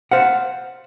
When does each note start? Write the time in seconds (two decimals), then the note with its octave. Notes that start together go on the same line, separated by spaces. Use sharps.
0.11 C5 F5 F#5